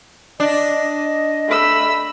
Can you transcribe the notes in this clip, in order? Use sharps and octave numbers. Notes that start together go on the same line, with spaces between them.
D4 D#5
A3 B5 E6